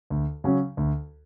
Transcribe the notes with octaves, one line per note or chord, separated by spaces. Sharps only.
D2
C#3 F#3 C#4
D2